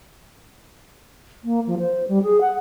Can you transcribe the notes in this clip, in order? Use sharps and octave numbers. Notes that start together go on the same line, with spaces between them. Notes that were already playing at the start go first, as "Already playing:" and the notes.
A#3
F3
C5
G3
G#4
F#5